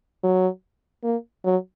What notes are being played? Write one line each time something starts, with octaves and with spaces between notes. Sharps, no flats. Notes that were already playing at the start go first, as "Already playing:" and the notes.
F#3
A#3
F#3